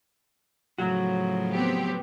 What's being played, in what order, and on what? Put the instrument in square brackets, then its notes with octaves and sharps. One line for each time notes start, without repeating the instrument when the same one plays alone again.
[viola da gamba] A2 C#3 F3 [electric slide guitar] F#3 F#4
[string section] B3 C4 G4